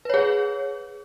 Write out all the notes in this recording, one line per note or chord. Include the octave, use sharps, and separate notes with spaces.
G#4 B4 C#5